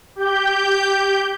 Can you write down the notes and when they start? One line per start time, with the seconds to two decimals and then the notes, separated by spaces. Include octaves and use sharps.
0.16 G4 G6